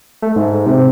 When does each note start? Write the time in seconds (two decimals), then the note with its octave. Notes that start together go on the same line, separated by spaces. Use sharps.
0.22 A3
0.36 G#2
0.66 C3